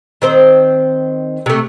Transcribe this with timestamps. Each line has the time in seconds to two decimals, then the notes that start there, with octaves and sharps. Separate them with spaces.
0.22 D#3 C4 C5
1.46 C3 A3